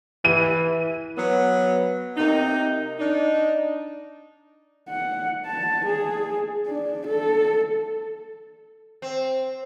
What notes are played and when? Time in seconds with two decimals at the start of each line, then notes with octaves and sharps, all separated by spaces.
0.25 E3 D#7
1.17 F#3 B3
2.17 C3 A#3 D#4
3.00 D4 D#4
4.89 F#5
5.46 A5
5.85 G#4
6.67 D4
7.07 A4
9.02 C4